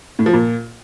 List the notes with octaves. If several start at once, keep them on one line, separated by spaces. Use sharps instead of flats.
A2
F3
A#2